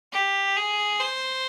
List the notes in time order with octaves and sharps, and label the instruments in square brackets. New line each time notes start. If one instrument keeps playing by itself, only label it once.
[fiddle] G4
G#4
C5